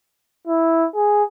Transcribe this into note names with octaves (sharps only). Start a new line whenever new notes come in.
E4
G#4